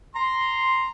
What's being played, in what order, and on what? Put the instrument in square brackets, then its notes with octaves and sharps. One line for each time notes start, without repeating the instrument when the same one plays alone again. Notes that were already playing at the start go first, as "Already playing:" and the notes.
[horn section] A#5 C6